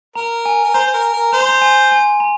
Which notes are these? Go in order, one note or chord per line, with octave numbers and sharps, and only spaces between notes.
A#4 A#5
G#5
A#4
C5 A#5
C5
A#4
A#4
C5 A#5
C6
A#5
G#5
G#5
A#5